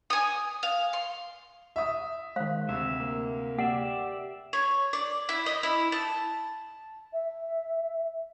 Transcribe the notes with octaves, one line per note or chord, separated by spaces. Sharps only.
G#5 D#6
F5
C6
E5 D#6
D#3 G#3 C5 F5
D2 C3 C4 E5
A#3
G4 D5 E5 F#5
C#5
D5
E4
D#5
E4
A5
E5